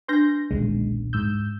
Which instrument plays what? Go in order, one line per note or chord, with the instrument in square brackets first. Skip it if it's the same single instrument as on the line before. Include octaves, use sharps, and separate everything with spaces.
[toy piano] D4 B4 [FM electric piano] C6 G6 A#6
[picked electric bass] D#1 B1 [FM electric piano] D3 G#3
[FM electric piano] G#2 E6 G6